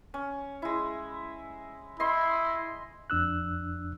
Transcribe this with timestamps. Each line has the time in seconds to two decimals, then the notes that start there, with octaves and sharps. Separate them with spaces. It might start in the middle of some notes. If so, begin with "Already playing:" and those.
0.14 C#4
0.62 G#3 E4
2.00 E4 D#5 C6
3.10 F2 D4 E6 F#6